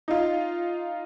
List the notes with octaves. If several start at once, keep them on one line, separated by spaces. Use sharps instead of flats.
D#4 F4